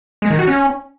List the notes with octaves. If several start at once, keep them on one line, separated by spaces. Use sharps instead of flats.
G#3
D#3
F#4
C#4